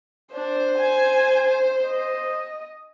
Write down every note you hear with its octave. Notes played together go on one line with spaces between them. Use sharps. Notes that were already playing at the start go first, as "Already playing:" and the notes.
D4 C5
G#5
D#5